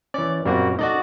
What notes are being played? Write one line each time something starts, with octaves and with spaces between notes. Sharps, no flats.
E3 C#4 D5
F#2 A#2 G3 A#3 C4 F#4
D#4 F#4 A4 D5 D#5